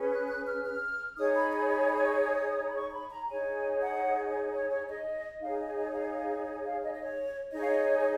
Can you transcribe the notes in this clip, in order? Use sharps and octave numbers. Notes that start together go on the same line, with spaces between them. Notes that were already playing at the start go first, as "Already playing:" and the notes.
Already playing: C#4 G#4 B4
F#6
F#6
F6
F6
D#4 G#4 C#5 D#6
B5
B5
B5
B5
C#6
D#6
G#5
A#5
B5
C#6
A#5
B5
A#5
D#4 G#4 C#5 G#5
F#5
C#5
C#5
D#5
D#4 G#4 C#5 F5
D#5
D#5
F5
F5
D#5
D#5
C#5
D#4 G#4 C#5 D#5
F5
D#5
C#5